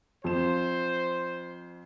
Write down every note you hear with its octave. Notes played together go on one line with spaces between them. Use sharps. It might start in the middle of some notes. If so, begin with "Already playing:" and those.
F2 C5 E7